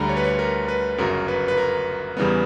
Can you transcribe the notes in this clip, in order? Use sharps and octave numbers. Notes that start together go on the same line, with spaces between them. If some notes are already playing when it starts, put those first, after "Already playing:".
Already playing: D2 D3 G3 A#5 B5
C#5
B4
C#5
A#4
B4
G1 F#2 C#3 F#3 A#4
B4
B4
A#4
E2 C#3 E3 G3 B3